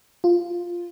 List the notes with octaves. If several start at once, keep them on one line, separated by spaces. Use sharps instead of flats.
F4